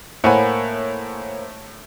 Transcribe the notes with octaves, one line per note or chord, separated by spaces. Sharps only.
A2 A#3 C5 C#5 F#5 G#5 B5